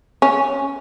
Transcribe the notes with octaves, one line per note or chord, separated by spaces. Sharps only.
C#4